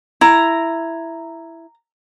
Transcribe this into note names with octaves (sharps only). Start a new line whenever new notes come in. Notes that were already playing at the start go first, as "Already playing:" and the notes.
E4 A#5